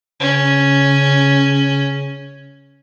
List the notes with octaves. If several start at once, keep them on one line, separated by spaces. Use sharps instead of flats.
C#3 C#4